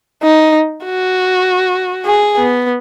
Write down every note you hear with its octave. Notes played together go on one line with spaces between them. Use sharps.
D#4
F#4
G#4
B3